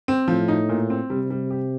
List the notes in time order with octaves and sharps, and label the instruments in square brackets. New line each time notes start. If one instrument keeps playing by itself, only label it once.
[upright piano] C4
[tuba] A2 [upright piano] F3
[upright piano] D#4
A#2
C4
[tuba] C3 [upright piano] G3
[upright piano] G3
G4